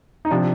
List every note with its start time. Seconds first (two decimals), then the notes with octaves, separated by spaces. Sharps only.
0.25 D#4
0.31 C3 F3 D4